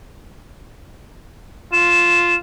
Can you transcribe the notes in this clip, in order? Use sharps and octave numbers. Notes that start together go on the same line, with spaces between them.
F4 E7